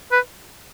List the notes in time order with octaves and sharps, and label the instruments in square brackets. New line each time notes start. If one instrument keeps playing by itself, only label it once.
[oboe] B4